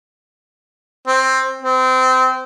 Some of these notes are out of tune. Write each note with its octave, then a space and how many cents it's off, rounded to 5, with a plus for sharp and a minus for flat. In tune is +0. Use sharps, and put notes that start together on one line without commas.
C4 +10
C4 -25